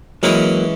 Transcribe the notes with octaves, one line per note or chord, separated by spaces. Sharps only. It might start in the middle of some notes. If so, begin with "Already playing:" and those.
E3 F#3 G#3 A#3 C#4 E4